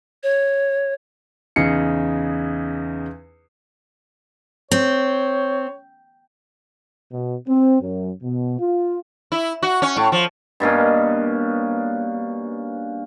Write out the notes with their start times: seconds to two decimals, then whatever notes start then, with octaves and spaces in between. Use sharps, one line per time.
0.23 C#5
1.56 E2 C#3 D#4 C7 C#7
4.71 C4 C#5
7.12 B2
7.48 C4
7.81 F#2
8.23 B2
8.60 F4
9.32 E4
9.63 F#4
9.82 C#4
9.96 A2
10.12 F3
10.60 G2 B2 A#3 C#4